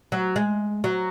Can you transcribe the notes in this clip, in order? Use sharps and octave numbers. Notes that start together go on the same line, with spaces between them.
F#3
G#3
F#3